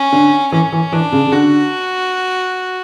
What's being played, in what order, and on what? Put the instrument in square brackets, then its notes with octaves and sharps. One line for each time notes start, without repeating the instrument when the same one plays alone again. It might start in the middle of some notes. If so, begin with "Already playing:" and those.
Already playing: [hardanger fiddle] C#4
[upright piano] D3
[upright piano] E3 [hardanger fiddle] C#4
[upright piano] E3
[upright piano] E3 [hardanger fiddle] D4
[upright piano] C#3
C#3
[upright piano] D3 [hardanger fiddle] F#4